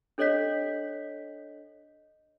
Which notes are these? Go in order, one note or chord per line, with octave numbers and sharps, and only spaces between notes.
D4 A4 C#5 D#5 G6 B6